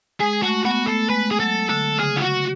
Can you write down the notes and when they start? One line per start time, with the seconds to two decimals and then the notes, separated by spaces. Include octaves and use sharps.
0.20 G#3 G#4
0.43 A3 F#4
0.65 B3 F#4
0.87 A3 A4
1.09 G#3 B4
1.31 G#4
1.40 F#3 A4
1.69 D3 A4
1.99 C#3 G#4
2.16 F4
2.22 F#4